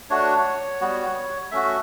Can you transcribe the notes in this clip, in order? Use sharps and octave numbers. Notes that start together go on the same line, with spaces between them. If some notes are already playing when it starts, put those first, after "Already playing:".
A3 D4 F#4 C#5
G3 B3 F#4
A3 C#4 F#4 E5